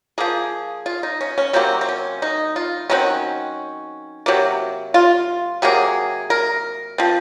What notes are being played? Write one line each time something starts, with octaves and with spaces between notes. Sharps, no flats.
F3 A#3 G#4
F4
D#4
C#4
C#4
C3 F#3 A#3 C4
C4
C#4
D#4
F4
D#3 F#3 C4 C#4
C3 F#3 A#3
F4
C3 F#3 A#3 G#4
A#4
F3 C4